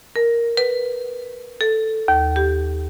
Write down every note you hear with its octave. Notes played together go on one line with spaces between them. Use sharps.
A#4
B4
A4
D#2
G4